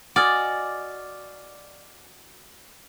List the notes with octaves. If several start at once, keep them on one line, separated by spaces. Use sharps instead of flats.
F#4 D5 D#5 G#5 D6 F6 A6